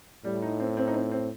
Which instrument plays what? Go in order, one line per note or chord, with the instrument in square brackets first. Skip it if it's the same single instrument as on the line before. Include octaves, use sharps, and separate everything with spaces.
[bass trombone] A2 [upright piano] G3
[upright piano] D#4
C4
C4
D#4
C4
C4